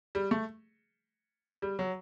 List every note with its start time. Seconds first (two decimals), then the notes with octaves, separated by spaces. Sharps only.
0.15 G3
0.31 A3
1.62 G3
1.79 F#3